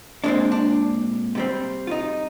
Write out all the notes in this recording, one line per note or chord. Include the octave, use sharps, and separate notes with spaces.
A#2 G#3 C4 D4
D4
C3 G3 C4
F4
D#4